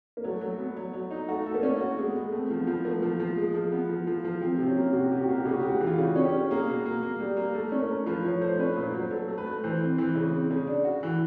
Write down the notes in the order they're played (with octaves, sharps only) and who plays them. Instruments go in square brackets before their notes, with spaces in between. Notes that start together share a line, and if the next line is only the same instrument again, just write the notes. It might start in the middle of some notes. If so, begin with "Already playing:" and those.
[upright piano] A#3
[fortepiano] F#3 [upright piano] A3
[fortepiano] F#3
B3
F#3
F#3
D#4
[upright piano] A3 [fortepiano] F#4
[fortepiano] A4
[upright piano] A#3
[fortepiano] C#4
F#4
G#3
[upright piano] B3
[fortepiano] G#3
[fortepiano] A3 [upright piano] C4
[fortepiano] F3
[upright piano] B3
[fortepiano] F3
[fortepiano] A3 [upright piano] A#3
[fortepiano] F3
F3
G#3
F3
B3
F3
F3
F3
[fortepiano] F3 [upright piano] C4
[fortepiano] C3 [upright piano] C4
[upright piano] C#4
[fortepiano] A#3
[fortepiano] C3 [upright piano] F#4
[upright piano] G4
F#4
[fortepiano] C3 [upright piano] G4
[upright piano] F#4
[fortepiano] A#3 [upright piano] G4
[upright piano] F#4
[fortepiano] C#3 [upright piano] G4
[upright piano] F#4
G4
[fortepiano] G#3 [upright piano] F#4
[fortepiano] E3
[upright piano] F4
[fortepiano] C#3 [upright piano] F#4
[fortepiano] C#4
[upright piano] G4
[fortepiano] C#4
[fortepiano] A#3 [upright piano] G#4
[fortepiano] B2
A#3
A#3
G3
A#3
[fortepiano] A3 [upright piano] A4
[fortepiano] C#4
[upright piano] A#4
[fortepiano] A3
[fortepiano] F3 [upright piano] B4
[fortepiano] F3 [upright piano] C#5
[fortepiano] A3 [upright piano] C5
[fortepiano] C#4 [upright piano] B4
[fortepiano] A#2 [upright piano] B4
[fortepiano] F#3 [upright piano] C5
[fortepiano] F#3 [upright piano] A4
[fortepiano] A3
[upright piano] B4
[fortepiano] A3
[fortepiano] E3 [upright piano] C5
[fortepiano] C4
E3
C#3
C4
C#3
D4
F#4
E3